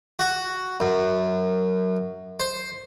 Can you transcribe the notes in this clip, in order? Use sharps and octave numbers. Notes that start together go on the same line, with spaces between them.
F#4
F#2
C5